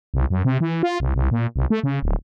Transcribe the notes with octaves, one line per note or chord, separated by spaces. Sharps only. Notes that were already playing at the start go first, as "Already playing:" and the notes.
C2
F#2
C3
E3
F4
C2
C2
A#2
C2
A3
C#3
D1